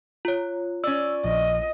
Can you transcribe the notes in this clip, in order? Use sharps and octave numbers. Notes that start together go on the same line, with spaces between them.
F4 C#5
C#4 D5 E6
A#1 D#5